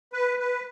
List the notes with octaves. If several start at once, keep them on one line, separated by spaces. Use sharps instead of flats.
B4
B4